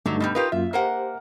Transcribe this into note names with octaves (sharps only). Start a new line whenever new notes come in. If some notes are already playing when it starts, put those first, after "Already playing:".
G2 D3 F#3 A3 D#4
B2 F3 G3
D#4 F4 G4 A#4 B4
F#2 A#3 F4 E5
A#3 G4 A#4 C5 F#5